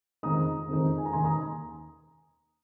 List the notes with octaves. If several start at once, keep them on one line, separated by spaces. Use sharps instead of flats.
F2 D#3 G#3 D#4 A#5 D#6
F2 D#3 G#3 D#4
G#5
A#5
D#2 D#3 A#3 D#4 G#5 C6
A#5 D#6